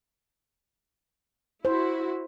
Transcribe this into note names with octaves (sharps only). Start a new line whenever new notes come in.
E4 F#4 C5